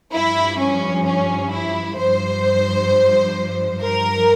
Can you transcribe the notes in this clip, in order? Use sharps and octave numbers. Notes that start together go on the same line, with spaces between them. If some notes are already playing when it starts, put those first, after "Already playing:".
G2 F3 E4
C#4
C#4
E4
G2 F3 C5
G2 F3 A#4